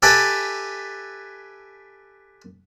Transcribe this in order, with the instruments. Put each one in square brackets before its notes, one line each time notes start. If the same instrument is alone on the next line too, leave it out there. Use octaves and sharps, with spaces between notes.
[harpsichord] G4 A4 B4 E5 G5 G#5